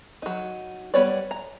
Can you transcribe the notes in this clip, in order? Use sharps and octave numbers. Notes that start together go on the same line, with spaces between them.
F#3 D#4
G3 B3 C#5 D5
A#5